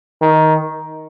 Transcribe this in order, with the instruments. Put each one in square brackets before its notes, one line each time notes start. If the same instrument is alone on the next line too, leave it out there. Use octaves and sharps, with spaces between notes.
[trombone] D#3